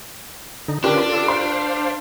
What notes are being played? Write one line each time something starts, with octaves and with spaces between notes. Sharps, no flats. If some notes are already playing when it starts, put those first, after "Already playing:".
D3 D#4
C#4 D4 F4 G4 A#4 B4 D6
F4 A4
C5 F5 C6